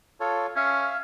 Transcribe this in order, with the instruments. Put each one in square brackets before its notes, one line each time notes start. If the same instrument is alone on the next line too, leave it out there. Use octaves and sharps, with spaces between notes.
[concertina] F4 A4 C#5
[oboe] C#4 [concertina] E5 F5